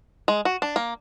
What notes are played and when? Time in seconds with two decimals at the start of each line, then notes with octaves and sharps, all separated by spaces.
0.28 G#3
0.45 F#4
0.62 D4
0.76 A#3